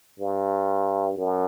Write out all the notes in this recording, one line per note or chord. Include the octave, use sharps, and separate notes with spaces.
G2
F#2